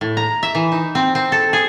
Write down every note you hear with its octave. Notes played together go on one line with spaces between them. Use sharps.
A2
A#5
E5
E3
D#4
C4
C4
A4
G#4